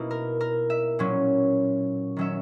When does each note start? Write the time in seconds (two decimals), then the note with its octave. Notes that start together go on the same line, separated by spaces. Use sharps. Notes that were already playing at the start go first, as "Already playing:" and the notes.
Already playing: B2 A#3 D#4 E4
0.11 A#4
0.41 A#4
0.70 E5
0.99 A#2 F#3 C#4
2.17 D#3 F#3 C#4 E5